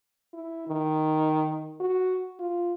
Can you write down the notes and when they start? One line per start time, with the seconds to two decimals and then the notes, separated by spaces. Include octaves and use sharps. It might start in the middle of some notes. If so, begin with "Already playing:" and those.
0.33 E4
0.68 D#3
1.80 F#4
2.39 F4